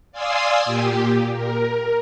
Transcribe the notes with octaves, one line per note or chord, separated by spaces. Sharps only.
D5 F5 G#5 C6 D#6 E6
A#2 G4
A#4